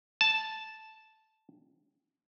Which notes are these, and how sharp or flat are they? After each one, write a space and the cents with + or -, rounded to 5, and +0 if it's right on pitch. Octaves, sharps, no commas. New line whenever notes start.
A5 -5